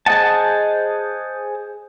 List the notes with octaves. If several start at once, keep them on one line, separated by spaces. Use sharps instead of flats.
G#4 C5 D#5 F#5 A5